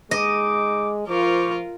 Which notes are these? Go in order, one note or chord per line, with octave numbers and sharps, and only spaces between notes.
G#3 D#4 D#5 D6
F3 F4 A#4 C5 C#6 D6